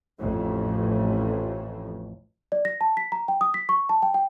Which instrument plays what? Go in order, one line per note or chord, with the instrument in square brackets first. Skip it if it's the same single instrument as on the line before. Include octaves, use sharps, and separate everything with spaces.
[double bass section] A1 F2 A2
[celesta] D5
A#6
A5
B6
A#5
G5
D#6
B6
C#6
A5
G5
G5